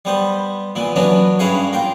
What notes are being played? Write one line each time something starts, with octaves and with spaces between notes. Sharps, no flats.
G3 B3 C5
A#2 E3 B3
E3 F#3 B3 C#4 D4
G2 C#4 E4 G#4 F5 F#5
A#3 F4 G5